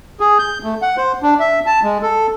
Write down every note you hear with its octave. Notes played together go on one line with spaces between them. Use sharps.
G#4
G6
A3
F#5
C5
D4
E5
A5
G#3
A4